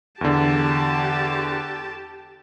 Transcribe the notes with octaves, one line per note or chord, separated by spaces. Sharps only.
E2 D3 G4 A5